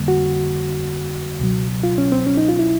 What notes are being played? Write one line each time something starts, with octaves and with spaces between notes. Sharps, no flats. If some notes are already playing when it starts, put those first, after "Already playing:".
Already playing: F2 D3 G3 A#3
F#4
C#2 B2 F#3
F4
C#4
C4
C#4
D#4
F4
E4